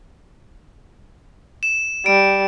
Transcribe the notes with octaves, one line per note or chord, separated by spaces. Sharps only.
E7
G3 D7